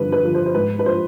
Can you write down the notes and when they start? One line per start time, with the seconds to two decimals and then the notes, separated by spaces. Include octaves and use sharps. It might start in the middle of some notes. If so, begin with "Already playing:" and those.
Already playing: G2 D3 F3 B4
0.12 B4
0.23 D3 F3
0.34 C5
0.46 C5
0.55 G#2 B4
0.79 B4
0.86 F3 C5